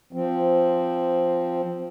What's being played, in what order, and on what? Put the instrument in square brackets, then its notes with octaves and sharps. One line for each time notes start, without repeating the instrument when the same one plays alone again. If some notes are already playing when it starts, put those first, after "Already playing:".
[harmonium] F3 C4